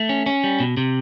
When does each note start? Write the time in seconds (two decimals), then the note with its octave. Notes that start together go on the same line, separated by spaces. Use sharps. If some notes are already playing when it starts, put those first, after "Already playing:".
Already playing: A3
0.09 C#4
0.26 C#4
0.44 G3
0.60 B2
0.77 C3